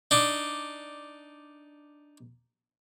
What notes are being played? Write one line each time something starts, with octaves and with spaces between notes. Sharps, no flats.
D4 D#4